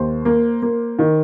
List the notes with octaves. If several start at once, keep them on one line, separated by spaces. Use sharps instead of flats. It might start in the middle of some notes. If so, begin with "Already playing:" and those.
Already playing: D#2 C5
A#3
A#3
D#3